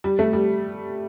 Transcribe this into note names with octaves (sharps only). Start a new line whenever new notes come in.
G3
A3
G3